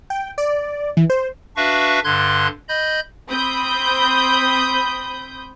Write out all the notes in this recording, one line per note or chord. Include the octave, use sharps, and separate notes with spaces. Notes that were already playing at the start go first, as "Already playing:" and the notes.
G5
D5
E3
C5
D4 F#4 B4 E5 F5 C#6
G2 D3 C6 F#6 G#6
D#5 B5 G6
C4 B5 D#6 G6